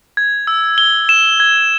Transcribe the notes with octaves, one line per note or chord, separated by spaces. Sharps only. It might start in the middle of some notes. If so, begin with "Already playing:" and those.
G#6
E6
G7
E7
G#6